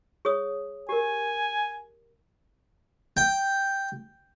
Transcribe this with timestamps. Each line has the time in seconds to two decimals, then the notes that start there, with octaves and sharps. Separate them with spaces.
0.25 G#4 C#5 D#6
0.89 G4 A#4 G#5
3.17 G5